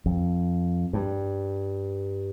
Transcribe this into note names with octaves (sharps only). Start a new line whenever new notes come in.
F2
G2